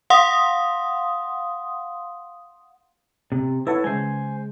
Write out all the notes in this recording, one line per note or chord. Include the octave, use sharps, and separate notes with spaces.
F5 F#5 C6 D#6
C3
E4 A4 B4 C#5 F#5
C#3 G#3 C5 G#5